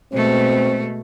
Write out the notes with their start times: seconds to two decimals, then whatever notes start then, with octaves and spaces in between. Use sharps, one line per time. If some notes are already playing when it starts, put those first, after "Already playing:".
0.14 B2 G#3 A3 C4